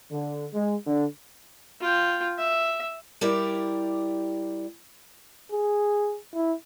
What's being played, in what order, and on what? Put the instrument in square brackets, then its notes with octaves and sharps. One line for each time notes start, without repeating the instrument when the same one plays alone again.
[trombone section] D3
G#3
D3
[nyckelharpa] F4 G5
E5
[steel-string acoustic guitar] G3 E4 G4 A#4 D5
[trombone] G#4
E4